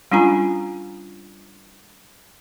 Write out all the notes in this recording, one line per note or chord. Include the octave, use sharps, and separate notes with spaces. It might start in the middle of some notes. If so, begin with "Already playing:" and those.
G3 C#4 D4 F4 G#5 A#5